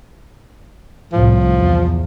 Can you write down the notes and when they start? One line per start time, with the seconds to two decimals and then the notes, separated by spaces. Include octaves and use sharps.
1.13 C2 A2 F3
1.58 E2